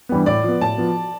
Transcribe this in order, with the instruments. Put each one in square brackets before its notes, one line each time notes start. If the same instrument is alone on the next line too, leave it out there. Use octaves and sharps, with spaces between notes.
[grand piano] G2 E3 G3 B3
[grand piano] A2 [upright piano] D5
[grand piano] F3 B3
[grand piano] A2 [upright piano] A5
[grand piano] F3 B3